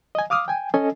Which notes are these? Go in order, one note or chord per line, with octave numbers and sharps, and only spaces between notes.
D#5 G#5
F5 D6 D#6 F6
G5 G#5
C#4 A4 D#5 G#5